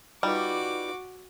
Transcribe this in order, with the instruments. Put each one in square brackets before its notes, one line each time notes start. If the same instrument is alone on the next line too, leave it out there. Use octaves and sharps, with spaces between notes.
[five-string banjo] G3 [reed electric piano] D#4 F4 B4 [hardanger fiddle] F#4 D6